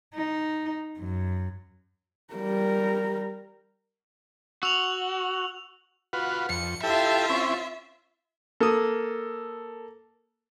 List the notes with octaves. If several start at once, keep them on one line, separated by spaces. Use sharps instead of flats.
D#4
F#2
G3 A#4
F#4 E6 F7 F#7
F4 F#4 B4
F2 C#7
E4 F4 G4 A4 E5
C4 C#4 E4
A#3 A4 D#6